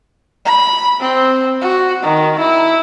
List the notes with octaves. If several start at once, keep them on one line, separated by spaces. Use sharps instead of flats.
B5
C4
F#4
D#3
E4